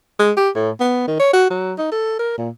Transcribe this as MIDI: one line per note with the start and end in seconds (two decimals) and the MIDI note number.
0.19 0.32 56
0.37 0.50 67
0.56 0.71 45
0.80 1.04 59
1.08 1.18 51
1.20 1.30 73
1.33 1.47 66
1.50 1.73 54
1.78 1.91 63
1.92 2.17 69
2.19 2.35 70
2.38 2.50 46